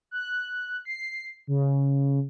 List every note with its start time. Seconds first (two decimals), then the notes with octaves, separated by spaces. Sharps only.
0.11 F#6
0.85 C7
1.47 C#3